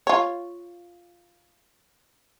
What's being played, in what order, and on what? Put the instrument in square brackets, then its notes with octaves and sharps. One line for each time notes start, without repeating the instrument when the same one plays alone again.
[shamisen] F4 C#5